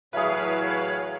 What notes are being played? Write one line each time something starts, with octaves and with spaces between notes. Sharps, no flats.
A2 E3 F#3 G#4 B4 C#5 E5 F5